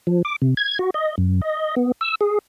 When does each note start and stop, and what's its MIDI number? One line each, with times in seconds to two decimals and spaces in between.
0.07 0.22 53
0.25 0.36 86
0.42 0.54 48
0.57 0.78 92
0.79 0.90 66
0.94 1.15 75
1.18 1.41 42
1.41 1.75 75
1.76 1.92 59
2.01 2.15 88
2.21 2.38 68